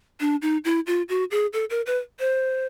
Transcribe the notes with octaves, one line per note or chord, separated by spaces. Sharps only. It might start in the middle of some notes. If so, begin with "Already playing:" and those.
D4
D#4
E4
F4
F#4
G#4
A4
A#4
B4
C5